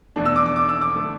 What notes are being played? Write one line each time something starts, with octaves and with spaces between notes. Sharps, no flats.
E2 B2 A3 D4
E6
D6
D6
D6
E6
D6
D3 A3